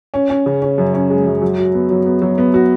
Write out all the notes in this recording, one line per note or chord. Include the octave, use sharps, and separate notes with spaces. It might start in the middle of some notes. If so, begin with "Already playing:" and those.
C#4
C#4
C#3
C#4
F#2
C#4
G#3
F#2
F#3
F#4
B3
F#3
B3
F#3
B3
F#4